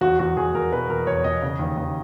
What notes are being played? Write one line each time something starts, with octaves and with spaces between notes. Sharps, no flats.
E2 F#4
E2 F#4
E2 G#4
E2 A#4
B2 B4
E2 A#4
E2 C#5
E2 D#5
C#3
D#2
D#2